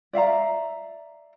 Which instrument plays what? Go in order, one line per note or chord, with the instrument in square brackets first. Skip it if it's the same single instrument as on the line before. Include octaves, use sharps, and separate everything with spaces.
[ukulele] D5 E5 F5 A#5